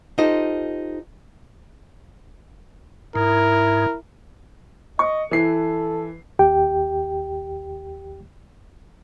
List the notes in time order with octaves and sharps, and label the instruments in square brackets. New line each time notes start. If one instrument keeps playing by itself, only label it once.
[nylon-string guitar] D#4 F4 G4 A4 C5 D#5
[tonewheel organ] G#2 [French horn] E4 [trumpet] A#4
[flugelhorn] D#5 [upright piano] C#6
[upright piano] E3 C7 [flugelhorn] A4
[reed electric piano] D#2 G4 G5